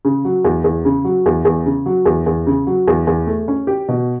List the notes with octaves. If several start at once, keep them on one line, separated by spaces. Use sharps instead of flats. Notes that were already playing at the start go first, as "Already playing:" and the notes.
C#3
F#3
E2
E2
C#3
F#3
E2
E2
C#3
F#3
E2
E2
C#3
F#3
E2
E2
A3
C#4
G4
B2